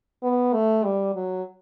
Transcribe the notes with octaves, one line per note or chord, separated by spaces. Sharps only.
B3
A3
G3
F#3